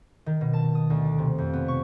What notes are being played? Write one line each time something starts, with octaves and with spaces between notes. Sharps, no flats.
D#3
B2
A5
D#6
D2
D5
C3
F2
B3
C#6